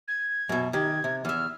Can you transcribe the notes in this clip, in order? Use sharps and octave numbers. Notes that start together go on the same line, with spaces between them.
G#6
F#2 B2
D#3 G4 G#6
C3
E2 E5 F6